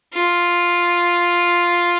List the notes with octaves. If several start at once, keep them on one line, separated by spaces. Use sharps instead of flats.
F4